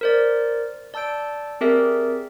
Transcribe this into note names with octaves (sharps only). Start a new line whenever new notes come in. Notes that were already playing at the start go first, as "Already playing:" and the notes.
A#4 C5 D5
D5 A5 E6 G6 D7
C4 G4 G#4 A#4 D5 E5